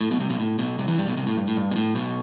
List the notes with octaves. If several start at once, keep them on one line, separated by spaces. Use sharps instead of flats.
A2
B1 B2
C2 C3
B1 B2
A2
B1 B2
C2 C3
E2 E3
G2 G3
B1 B2
C2 C3
A2
G2
A2
G2
B2
A2
B1 B2